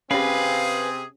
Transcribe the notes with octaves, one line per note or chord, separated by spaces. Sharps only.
C3 C4 C#4 G4 G#4 B4 F5